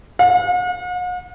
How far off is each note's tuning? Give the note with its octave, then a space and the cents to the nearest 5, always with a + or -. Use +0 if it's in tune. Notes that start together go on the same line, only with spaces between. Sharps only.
F#5 -45